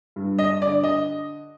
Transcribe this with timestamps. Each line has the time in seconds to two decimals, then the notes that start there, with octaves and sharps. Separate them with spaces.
0.16 G2
0.39 D#5
0.61 D3 D5
0.83 D#5